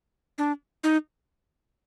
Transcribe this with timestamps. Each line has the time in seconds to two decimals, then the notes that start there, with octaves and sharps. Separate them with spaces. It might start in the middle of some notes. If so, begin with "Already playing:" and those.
0.38 D4
0.84 D#4